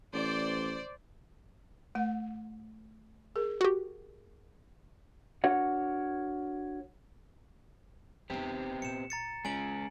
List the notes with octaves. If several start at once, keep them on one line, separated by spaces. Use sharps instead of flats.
A1 C5 D5
A3 F#5
G#4 A#4
F#4 G4
D4 F#4 A#4 C#5 F#5
E1 B3 C4 D#4 G4
A#2 C#7 E7
A#5 A6 C#7
G#3 C#4 G#5 D7 F#7